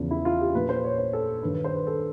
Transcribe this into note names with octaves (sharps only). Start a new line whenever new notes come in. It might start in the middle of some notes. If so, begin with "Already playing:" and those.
Already playing: E2 C#3 F3
E4
F4
G4
A#2 F3 B4
C5
C#5
C5
A4
G2 D#3 B4
B4
C5
B4
A4